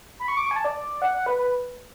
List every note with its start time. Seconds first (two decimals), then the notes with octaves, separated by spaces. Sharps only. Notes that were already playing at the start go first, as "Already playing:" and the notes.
0.19 B5
0.28 C#6
0.37 D6
0.46 C#6
0.51 G#5
0.56 A5
0.65 D5
1.02 F#5
1.14 F#5
1.26 B4
1.38 B4